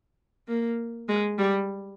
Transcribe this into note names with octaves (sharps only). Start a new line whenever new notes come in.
A#3
G#3
G3